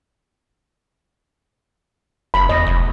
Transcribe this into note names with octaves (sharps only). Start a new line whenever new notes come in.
F#1 B5
E2 D#5
F1